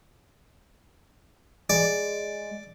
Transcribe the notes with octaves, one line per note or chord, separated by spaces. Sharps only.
G#3 D5